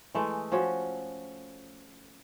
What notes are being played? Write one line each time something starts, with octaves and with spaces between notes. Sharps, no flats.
E3 G#3 A3
F3 C#4 F#4